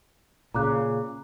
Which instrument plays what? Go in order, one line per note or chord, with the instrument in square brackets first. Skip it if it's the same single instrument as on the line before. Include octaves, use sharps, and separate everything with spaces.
[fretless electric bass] A#2 C#3 [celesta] A#5 D6 F#6